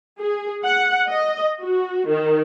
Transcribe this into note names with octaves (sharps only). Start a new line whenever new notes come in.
G#4
F#5
D#5
F#4
D#3